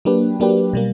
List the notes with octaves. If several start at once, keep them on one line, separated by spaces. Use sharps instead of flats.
F#3 A#3 D4 G4 B4
F#3 A#3 D4 G4 B4
B2 G3 A#3